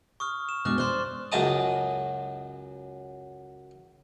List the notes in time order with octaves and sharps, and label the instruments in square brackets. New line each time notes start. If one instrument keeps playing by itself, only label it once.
[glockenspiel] C#6 D#6 F6
E7
[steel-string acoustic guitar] B2 G#3 D4 [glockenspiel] D6 F6 F#6
[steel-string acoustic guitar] C5 D5 [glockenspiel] C6 F#6 G7
[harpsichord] C#2 F#2 F#3 D#5 A5 D#6